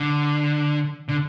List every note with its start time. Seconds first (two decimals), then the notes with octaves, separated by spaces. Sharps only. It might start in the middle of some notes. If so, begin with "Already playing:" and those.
Already playing: D3
1.09 D3